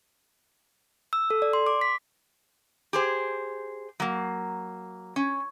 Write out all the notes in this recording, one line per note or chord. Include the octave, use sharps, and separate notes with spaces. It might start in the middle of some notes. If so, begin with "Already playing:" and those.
E6
A4
D5
C6
D6
B6
G4 G#4 C5
F#3 A#3
C#4